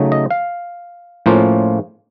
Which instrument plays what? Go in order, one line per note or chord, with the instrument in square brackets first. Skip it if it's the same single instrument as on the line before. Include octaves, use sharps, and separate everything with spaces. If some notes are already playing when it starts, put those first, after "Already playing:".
Already playing: [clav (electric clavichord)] C#3 F#3 A3 D#4
D#5
F5
A2 F3 A#3 C#4 F4